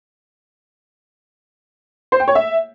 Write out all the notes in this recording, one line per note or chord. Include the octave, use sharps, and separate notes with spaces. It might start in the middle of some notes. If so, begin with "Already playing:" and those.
C5
G5
C#5
E5